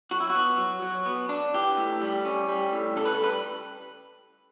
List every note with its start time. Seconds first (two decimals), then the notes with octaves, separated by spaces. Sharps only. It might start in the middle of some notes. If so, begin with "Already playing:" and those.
0.11 F#3 F#4
0.20 E4
0.30 F#4
0.35 B3
0.58 F#3
0.82 F#3
1.06 B3
1.29 D4
1.54 E3 G4
1.77 A2
2.01 G3
2.25 C#4
2.49 G3
2.72 A2
2.96 C#3 A4
3.05 B4
3.15 A4
3.20 G3 B4